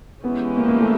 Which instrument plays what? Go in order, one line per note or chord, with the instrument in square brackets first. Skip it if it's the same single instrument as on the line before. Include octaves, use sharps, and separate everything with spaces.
[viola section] E3 G#3 C#4 E4 G4 [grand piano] B3
[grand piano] A#3
A#3
A3